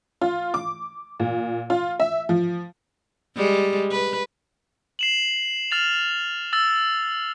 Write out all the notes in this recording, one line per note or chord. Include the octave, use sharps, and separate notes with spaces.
F4
D6
A#2
F4
E5
F3
G3 G#3
B4
C7 E7 F#7
F6 A6 F7
E6 A6